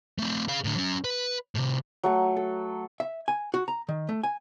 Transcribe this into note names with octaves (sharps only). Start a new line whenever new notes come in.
A3 C4
G#4 F5
A2 D3
F#3 C#4
B4
A2 C3
F#3 A3 A4
A4
E5
G#5
F#4
A#5
D#3
A3
G#5